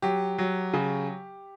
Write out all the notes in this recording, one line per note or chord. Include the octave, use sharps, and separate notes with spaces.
F#3 G4
F#3
C#3